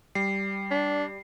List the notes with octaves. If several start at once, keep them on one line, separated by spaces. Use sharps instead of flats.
G3 C7
D4